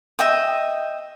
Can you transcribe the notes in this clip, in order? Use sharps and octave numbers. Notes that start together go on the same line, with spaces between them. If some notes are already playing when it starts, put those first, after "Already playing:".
D#5 E5 G5 D#6